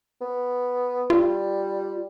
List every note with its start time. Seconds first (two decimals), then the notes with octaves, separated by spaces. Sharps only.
0.21 B3
1.10 G3 F4